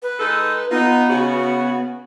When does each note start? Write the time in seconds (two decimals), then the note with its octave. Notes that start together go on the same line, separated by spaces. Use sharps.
0.03 B4
0.20 G#3 D#4 A4
0.71 B3 D#4 F4
1.10 C#3 F#4